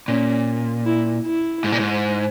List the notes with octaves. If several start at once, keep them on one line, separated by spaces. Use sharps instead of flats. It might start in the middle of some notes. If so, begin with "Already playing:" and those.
A#2 C#4
E4
E4
G#2
A#2
G#2